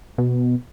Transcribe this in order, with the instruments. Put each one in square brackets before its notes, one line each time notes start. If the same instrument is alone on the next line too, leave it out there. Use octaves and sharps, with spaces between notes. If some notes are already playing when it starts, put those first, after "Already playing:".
[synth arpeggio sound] B2